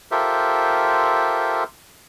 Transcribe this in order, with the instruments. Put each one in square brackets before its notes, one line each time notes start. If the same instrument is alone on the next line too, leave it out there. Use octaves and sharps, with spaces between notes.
[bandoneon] F4 G4 A4 A#4 C5 E5